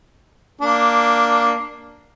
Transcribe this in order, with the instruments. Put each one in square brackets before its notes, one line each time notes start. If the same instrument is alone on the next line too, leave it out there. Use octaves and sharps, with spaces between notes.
[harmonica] A#3 D4